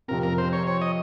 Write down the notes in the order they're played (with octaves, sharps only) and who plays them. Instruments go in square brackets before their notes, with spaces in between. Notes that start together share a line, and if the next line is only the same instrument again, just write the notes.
[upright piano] F2 C3 F3 C4 [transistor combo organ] A#4
[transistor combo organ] A#4
C5
C#5
C#5
D#5